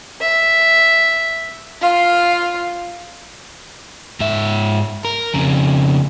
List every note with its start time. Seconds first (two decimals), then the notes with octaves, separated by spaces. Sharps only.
0.20 E5
1.81 F4 F5
4.20 G#2 E5
5.05 A#4
5.34 F2 C#3